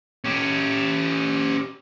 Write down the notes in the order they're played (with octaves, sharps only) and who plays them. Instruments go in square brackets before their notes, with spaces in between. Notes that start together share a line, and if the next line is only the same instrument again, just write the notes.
[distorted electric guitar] C#4 G4